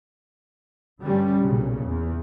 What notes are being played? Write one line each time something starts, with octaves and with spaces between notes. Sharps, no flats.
G2 D3 G3 C#4
B1 A#2 C#3
E2